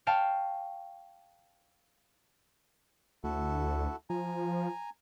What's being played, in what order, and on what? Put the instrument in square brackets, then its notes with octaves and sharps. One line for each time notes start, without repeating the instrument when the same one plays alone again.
[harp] C#5 F5 G5 A5
[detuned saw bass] D2 [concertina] E4 F#4 A4
[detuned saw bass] F3 [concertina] G#5 A#5